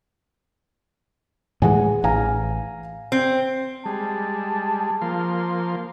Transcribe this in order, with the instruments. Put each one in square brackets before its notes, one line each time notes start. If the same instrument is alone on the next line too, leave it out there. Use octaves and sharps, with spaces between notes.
[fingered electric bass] A2 E3 G#3 [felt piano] G#4 F#5 G#5
[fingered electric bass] A1 [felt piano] F5 G#5 A#5
[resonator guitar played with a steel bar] C4
[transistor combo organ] G3 G#3 [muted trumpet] A5
[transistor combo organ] F3 A#3 C6